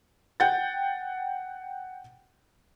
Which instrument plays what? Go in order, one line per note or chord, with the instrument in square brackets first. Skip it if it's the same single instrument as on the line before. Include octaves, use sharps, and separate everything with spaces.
[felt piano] F#5 G5 G6 A6